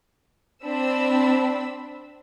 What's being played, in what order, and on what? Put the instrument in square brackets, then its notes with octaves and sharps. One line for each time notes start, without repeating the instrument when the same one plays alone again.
[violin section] C4 D4 B5 E6